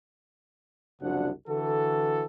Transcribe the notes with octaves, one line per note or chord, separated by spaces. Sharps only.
F#1 C2 F3 D4 F#4 F#5
D3 E3 F#4 A4